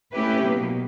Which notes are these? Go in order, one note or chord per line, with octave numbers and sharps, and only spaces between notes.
A3 C#4 E4 G4 B4
B2 F#3 A#3